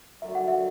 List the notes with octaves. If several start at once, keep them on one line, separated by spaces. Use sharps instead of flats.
F#2 D3 F#3 A3 E5
F#5
E5